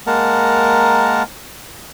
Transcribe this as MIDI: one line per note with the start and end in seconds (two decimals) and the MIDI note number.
0.07 1.23 56
0.07 1.23 58
0.07 1.23 70
0.07 1.23 78
0.07 1.23 81
0.07 1.23 82